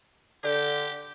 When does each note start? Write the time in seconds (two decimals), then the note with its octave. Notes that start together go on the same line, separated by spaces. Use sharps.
0.44 D3 G4